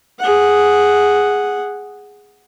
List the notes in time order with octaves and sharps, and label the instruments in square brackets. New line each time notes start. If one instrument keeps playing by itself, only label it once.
[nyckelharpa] G#4 F#5